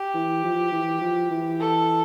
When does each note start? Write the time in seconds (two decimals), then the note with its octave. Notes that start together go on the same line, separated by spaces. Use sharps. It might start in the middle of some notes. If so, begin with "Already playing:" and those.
Already playing: G4
0.14 E3
0.44 F3
0.72 E3
1.01 F3
1.31 E3
1.60 A4